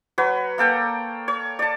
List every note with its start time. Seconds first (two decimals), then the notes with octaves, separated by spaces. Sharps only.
0.18 F#3 B4 C#5
0.58 A#3 A4 G5 A#5
1.28 C#5
1.59 D5 A5